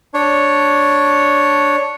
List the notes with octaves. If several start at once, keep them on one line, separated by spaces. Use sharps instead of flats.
D4 C#5